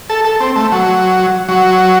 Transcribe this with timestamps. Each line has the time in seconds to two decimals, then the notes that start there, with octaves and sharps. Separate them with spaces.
0.10 A4
0.25 A4
0.40 C4
0.56 A3
0.72 F#3
1.48 F#3